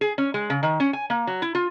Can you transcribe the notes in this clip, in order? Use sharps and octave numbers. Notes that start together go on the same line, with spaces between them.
G#4
C#4
G#3
C#3
D#3
C#4
G#5
A#3
F#3
E4
F4